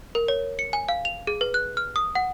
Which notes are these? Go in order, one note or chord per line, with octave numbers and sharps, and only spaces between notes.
A#4
C#5
C#7
G#5
F5
F7
G#4
B4
F#6
F6
D#6
F#5